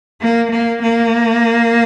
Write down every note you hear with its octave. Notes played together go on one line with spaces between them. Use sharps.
A#3
A#3
A#3